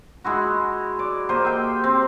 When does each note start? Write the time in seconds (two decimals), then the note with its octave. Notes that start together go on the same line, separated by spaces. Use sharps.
0.24 G#3 E4 F#4
0.99 D5
1.29 A#3 G4 C5 D#5
1.45 E5 G5
1.84 C4